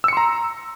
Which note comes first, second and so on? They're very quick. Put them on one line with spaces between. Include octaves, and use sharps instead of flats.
E6 C#7 C6 A#5